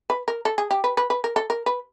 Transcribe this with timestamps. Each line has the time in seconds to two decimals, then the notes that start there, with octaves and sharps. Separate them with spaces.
0.10 B4
0.28 A#4
0.45 A4
0.58 G#4
0.71 G4
0.84 B4
0.97 B4
1.10 B4
1.24 A#4
1.36 A4
1.50 A#4
1.66 B4